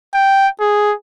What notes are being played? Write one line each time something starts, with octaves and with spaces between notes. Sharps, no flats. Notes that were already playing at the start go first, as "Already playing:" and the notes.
G5
G#4